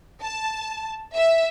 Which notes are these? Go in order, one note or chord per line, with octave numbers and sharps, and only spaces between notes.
A5
E5